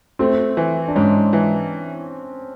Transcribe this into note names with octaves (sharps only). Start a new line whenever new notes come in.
A3 C4
E3
D4
G#2 C#4
E3